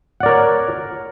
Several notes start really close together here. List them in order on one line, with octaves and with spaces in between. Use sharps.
F#5 D5 A#4 C#5